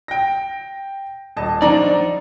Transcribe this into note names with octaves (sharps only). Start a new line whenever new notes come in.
G5 A#6
D#1 D#5 A5
F3 D4 D#4 D5 A#5